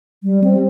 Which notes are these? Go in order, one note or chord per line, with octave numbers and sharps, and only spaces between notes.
G3
C4